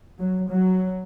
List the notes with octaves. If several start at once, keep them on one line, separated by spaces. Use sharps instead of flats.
F#3
F#3